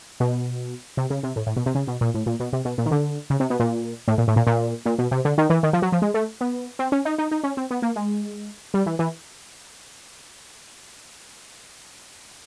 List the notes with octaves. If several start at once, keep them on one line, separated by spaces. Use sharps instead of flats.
B2
C3
C#3
C3
A2
A2
B2
C3
C#3
B2
A#2
A2
A#2
B2
C3
B2
A#2
D#3
D3
C#3
C3
B2
A#2
A2
A#2
A2
A#2
A#2
A#2
B2
C3
D3
D#3
E3
D#3
F3
F#3
F3
G#3
A3
B3
C4
C#4
D#4
D#4
D#4
C#4
C4
B3
A#3
G#3
G3
E3
E3